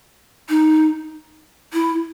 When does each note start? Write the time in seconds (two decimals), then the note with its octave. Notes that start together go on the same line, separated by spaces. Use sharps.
0.49 D#4
1.73 E4